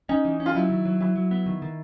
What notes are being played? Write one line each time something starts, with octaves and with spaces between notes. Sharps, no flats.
C#4 D#4
E3
C#4
F4
F#3 E4
D#3
F#3
F#3 E4
F#3
B3
D#3
D#3